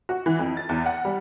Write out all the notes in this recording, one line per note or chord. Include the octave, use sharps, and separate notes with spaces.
F#4
E3
F2
A6
E2
F#5
G3